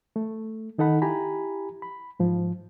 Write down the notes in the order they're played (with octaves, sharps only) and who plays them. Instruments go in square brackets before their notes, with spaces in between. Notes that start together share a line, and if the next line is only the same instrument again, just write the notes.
[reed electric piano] A3
D#3 D#4 A4 F#5 B5
E4 G4 G#5 A#5 B5
B5
G#2 F3